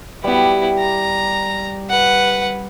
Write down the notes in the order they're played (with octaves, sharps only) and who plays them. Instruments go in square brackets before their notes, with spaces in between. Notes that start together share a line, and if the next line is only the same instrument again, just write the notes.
[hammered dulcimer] G3 G4 [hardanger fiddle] B3 E4
[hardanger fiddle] A#5
B4 F#5